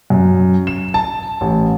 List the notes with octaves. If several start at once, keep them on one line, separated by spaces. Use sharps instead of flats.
F#2
E7
A5
A1